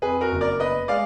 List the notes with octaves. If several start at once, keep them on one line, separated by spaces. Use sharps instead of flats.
F2 G#4 B4
F#4 A#4
F#1
A#4 D5
B3 B4 D#5
G#3 D5 F5